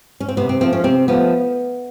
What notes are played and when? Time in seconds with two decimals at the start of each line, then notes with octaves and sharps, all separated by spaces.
0.20 C#4
0.29 C4
0.37 C3 B3
0.49 C4
0.61 F3 A3 C4
0.73 C#4
0.84 C3 C4
1.08 F3 A3 B3